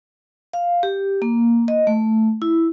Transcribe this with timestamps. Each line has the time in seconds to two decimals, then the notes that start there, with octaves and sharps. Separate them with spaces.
0.53 F5
0.83 G4
1.22 A#3
1.68 D#5
1.87 A3
2.42 E4